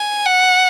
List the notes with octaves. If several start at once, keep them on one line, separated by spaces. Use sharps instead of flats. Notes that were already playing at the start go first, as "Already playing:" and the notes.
Already playing: G#5
F#5